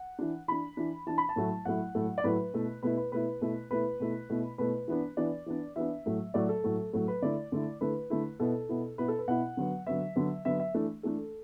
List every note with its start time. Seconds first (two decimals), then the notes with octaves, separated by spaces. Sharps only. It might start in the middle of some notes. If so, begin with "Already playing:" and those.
Already playing: F#5
0.19 E3 D4
0.48 E3 D4 B5
0.77 E3 D4
1.07 E3 D4 A5
1.18 B5
1.29 A5
1.36 A2 F#3 A3 E4
1.65 A2 F#3 A3 E4 F#5
1.95 A2 F#3 A3 E4
2.18 D5
2.24 A2 F#3 A3 E4 B4
2.54 B2 A3 E4
2.83 B2 A3 E4 B4
2.97 B4
3.12 B2 A3 E4 B4
3.41 B2 A3 E4
3.71 B2 A3 E4 B4
4.00 B2 A3 E4
4.30 B2 A3 E4
4.58 B2 A3 E4 B4
4.88 E3 B3 D4
5.17 E3 B3 D4 D5
5.46 E3 B3 D4
5.76 E3 B3 D4 E5
6.06 A2 F#3 A3
6.34 A2 F#3 A3 D5
6.49 A4
6.64 A2 F#3 A3
6.93 A2 F#3 A3 A4
7.08 B4
7.22 D3 A3 E4 D5
7.52 D3 A3 E4
7.81 D3 A3 E4 B4
8.10 D3 A3 E4
8.40 B2 B3 E4 A4
8.69 B2 B3 E4
8.98 B2 B3 E4 B4
9.08 A4
9.18 B4
9.28 B2 B3 E4 F#5
9.57 D3 F#3 B3
9.86 D3 F#3 B3 E5
10.16 D3 F#3 B3
10.45 D3 F#3 B3 E5
10.60 E5
10.74 E3 A3 D4
11.03 E3 A3 D4 A4